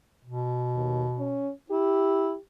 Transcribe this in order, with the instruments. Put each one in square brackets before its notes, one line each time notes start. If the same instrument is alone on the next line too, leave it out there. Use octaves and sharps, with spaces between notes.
[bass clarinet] B2
[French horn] D#2
C#4
[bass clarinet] E4 [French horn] G4